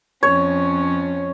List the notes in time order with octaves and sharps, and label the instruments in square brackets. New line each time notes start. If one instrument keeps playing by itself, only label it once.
[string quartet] F2 C#4 [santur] C#5